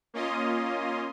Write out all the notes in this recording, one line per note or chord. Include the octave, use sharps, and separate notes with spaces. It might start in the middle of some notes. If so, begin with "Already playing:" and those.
A#3 C#4 F4 D#5 C6 D#6